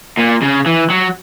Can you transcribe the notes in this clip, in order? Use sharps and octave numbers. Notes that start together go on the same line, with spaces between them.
A#2
C#3
E3
F#3